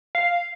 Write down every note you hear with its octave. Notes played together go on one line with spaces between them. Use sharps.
F5